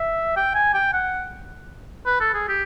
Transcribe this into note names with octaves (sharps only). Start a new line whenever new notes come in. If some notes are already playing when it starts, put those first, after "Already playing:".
Already playing: E5
G5
G#5
G5
F#5
B4
A4
G#4
G4